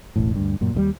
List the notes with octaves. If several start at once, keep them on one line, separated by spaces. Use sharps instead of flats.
E1 A1 A2
D2 G2
F#2 A#2
D#2 C#3 G3